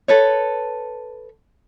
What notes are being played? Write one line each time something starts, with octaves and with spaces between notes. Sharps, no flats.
A4 B4 C#5